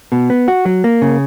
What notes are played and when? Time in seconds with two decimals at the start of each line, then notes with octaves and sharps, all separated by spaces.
0.12 B2
0.30 B3
0.48 F#4
0.65 F#3
0.84 A#3
1.02 C#3